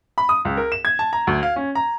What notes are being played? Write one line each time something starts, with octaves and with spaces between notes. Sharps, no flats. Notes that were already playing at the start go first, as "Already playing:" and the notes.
B5
D#6
C#2
A#4
E7
G#6
A5
A#5
D2
F5
C#4
A#5